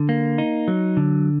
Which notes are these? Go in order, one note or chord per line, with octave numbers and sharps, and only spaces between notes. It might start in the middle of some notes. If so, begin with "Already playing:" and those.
Already playing: D3
A#3
D#4
F#3
D3